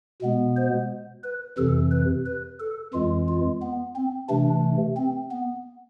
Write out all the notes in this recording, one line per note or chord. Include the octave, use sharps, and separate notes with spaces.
B2 G#3 B3
C5
B4
F2 C3 E3 A4
B4
B4
A4
F2 E3 G#3 F4
F4
B3
C4
C3 E3 A3 D4
C4
B3